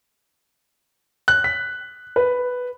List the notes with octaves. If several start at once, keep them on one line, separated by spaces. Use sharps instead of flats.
F#6
B6
B4